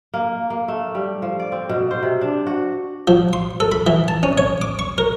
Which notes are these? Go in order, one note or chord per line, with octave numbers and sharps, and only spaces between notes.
A#3
A#3
A3
G3
F3
D5
C4
B2
C5
C3
D4
F#4
F3
C6
A4
B5
E3
A5
C#4
C#5
D6
C#6
A#4